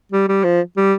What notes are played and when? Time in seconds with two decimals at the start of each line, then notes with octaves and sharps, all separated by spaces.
0.12 G3
0.29 G3
0.44 F3
0.77 G3